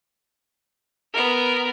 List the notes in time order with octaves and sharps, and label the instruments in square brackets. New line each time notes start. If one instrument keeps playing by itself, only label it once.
[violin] B3 A#4